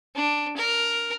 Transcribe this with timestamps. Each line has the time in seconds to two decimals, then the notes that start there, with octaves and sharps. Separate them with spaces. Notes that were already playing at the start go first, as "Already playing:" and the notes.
0.15 D4
0.57 A#4